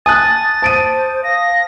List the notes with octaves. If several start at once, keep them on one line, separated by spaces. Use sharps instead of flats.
G#5 A5 D#6 F#6 A6
C5 A5 D7 D#7
F5 A#6